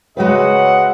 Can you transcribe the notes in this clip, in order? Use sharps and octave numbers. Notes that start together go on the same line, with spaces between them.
C#3 G#3 F#4 B4 D#5 E5 F#5